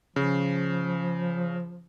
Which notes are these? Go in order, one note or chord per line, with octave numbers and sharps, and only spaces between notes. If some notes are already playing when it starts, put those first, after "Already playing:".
C#3 F3